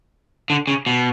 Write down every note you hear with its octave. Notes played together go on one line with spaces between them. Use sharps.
D3
C#3
B2